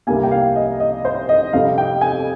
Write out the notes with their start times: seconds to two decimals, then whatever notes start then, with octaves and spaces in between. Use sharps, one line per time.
0.07 C2 C3 G3 A#3 G#5
0.23 G5
0.31 F5
0.56 D#5
0.80 D#5
1.05 C5
1.29 D#5
1.53 F2 C3 G3 F5
1.78 G5
2.01 G#5